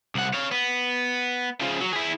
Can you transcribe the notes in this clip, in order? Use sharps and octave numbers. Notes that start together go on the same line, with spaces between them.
C2 F#5
C#5 F5
B3
C#3 F3
F#3
E4 G#4